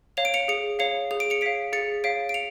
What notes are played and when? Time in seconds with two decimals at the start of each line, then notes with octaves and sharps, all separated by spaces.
0.17 C#5 F5 F7
0.25 D7
0.34 C#7 F7
0.48 G#4 C#7 F7
0.79 C#5 F5 C#7 F7
1.11 G#4 F7
1.20 D7
1.30 C#7 F7
1.41 C#5 F5 B6 D7
1.73 G#4 A6 C#7
2.04 C#5 F5 B6 D7
2.29 D7
2.34 C#7 F7